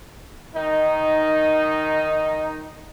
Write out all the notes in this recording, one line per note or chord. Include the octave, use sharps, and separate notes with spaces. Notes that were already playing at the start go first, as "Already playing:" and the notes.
D#3 D#4